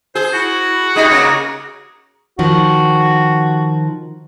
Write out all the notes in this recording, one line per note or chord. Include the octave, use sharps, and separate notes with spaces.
G#4 C5
E4 F#4
G3 D#4 G#4
C#3 A#3
D#3 F3 F#4